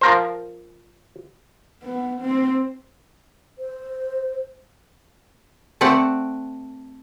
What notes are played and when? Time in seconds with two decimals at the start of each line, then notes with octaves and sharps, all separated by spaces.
0.01 F3 A#4 C5
1.83 B3
2.21 C4
3.59 C5
5.81 A3 C4 D5 F#5